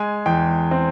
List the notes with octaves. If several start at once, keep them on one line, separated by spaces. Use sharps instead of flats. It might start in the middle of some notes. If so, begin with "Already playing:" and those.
Already playing: G#3 G#5
E2 G5
C4